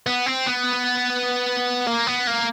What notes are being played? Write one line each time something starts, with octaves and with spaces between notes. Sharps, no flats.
B3
C4
B3
A#3
B3
A#3